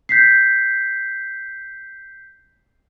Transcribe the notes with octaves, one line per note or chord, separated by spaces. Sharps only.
G6 B6 C7